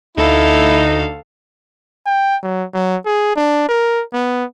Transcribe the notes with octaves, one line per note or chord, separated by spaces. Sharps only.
D2 D#4 E4 A4 F5
G5
F#3
F#3
G#4
D4
A#4
B3